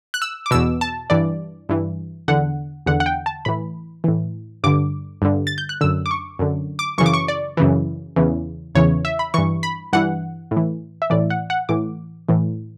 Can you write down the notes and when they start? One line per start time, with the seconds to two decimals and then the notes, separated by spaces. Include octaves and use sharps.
0.14 F#6
0.22 E6
0.46 D6
0.51 E2 B2 E6
0.81 A5
1.10 G2 E3 D5
1.69 G2 E3
2.28 E2 D3 F#5
2.86 E2 D3 F#5
3.00 F#5
3.06 G5
3.26 A5
3.45 A2 E3 B5
4.04 A2 E3
4.64 G2 D3 D6
5.22 G2 D3
5.47 A6
5.58 G6
5.69 F#6
5.81 F#2 D3 E6
6.06 D6
6.11 C#6
6.39 F#2 D3
6.79 D6
6.98 F#2 C#3 E3 C#6
7.06 D6
7.14 C#6
7.28 D5
7.57 F#2 C#3 E3
8.16 E2 C#3 E3
8.75 E2 C#3 E3 C#5
9.05 E5
9.19 B5
9.34 G2 E3 C#6
9.63 B5
9.93 G2 E3 F#5
10.51 A2
10.57 E3
11.02 E5
11.10 A2 E3 D5
11.30 F#5
11.50 F#5
11.69 A2 E3 D6
12.29 A2 E3